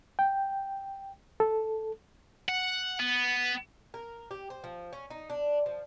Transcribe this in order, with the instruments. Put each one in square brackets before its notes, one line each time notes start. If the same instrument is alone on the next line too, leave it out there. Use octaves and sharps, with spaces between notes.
[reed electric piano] G5
A4
[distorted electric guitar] F#5
B3
[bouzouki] A#4
G4
C5
F3
C#4
D#4
D4
F3